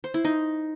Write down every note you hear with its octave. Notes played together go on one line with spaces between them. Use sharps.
C5
E4
D#4